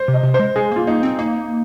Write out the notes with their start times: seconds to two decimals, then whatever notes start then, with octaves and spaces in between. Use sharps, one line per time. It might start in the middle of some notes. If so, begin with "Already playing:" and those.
Already playing: C5
0.08 C3
0.14 D#5
0.23 C3
0.34 C5
0.39 G#3
0.56 G#3 G#4
0.72 A#3 F4
0.87 A#3 D#4
1.03 C4
1.19 A#3 D#4